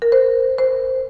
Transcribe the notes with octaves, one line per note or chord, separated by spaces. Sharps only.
A#4
C5
C5